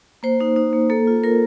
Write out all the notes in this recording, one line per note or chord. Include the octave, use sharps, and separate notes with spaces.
A#3 C5
D#4
D#4
A#3
A#3 A4
F4
F4 A#4